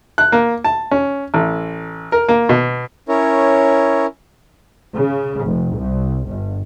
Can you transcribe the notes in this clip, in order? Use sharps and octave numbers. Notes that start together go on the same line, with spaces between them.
F#6
A#3
A5
C#4
A1
A#4
A#3
B2
C#4 E4 A#4 C#5
C#3
F1
C2
G1